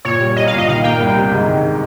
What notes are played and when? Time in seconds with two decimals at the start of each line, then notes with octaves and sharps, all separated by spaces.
0.05 A#2 C#5
0.20 G3
0.36 C2 D#5
0.47 F5
0.53 A#2
0.58 D#5
0.68 D#3 F5
0.84 A#3 G5
1.00 C2
1.16 C3
1.32 G#2
1.48 D#3